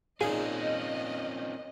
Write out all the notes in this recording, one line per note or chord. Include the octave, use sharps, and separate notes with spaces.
A#2 C4 C#4 D#4 F4 G#4 D#5